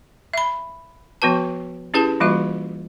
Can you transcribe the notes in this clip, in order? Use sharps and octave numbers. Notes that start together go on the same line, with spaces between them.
E5 B5
F3 B3 F#4 B4 A5
C#4 E4 G4 G#4 B4 A5
E3 G3 A#3 F4 F#4 E5